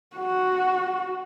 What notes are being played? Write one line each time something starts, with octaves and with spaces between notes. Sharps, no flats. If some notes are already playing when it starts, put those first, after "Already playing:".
F#4